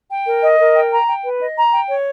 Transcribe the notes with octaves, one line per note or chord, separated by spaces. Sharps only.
G5
A#4
D#5
A#4
G5
A#5
G5
B4
D#5
A#5
G5
C#5